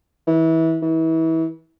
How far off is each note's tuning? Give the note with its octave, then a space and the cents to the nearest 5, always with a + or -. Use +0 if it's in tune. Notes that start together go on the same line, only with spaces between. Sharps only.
E3 -25
E3 -30